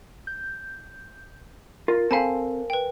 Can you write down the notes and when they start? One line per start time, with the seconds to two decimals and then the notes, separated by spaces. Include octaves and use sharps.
0.27 G6
1.88 F4 A#4
2.11 C4 A4 F5 G#5 A5 B5
2.70 B4 G5